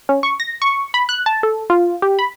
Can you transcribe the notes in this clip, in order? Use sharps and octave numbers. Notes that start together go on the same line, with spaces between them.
C#4
C#6
A#6
C#6
B5
F#6
A5
A4
F4
G4
B5